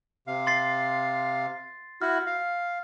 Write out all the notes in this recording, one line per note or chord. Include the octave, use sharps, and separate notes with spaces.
C3 F5
C6 A6 C7
E4 F#4 F6
F5